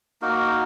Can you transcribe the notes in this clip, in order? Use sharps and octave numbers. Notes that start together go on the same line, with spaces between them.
A#3 D#4 F#4 A#4